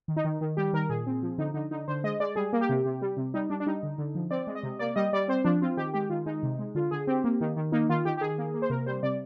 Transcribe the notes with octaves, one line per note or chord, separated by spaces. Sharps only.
D#3
D#4
D#3
D#3
G3 G4
D#3 A#4
A#2 G#4
C4
F3
D3 D#4
D3 D#4
D3 D#4
D3 C5
G#3 D#5
G#3 D5
G3 G#4
A#3
G4
C3
C3
G3
C3
G3 D#4
G3 D4
D4
G3 D#4
D3
D3
F3
C4 D5
G#3
D#5
C3
A#3 D5
G3 D#5
G3 D5
C4 C5
F3 D4
C4 F4
D#3 G4
G#3 G4
D#3 F4
G#3 D#4
C3
G#3
D3 F4
D3 G#4
C4 G4
A#3
D#3
D#3
A#3 D#4
D#3 F4
D#3 G4
G4
D#3 G#4
A#3
A#3
C5
C3 A#4
G3 C5
C3 D5